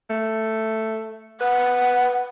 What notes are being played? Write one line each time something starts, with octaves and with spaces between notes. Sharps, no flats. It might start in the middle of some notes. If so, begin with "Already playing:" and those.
A3
B4 F#5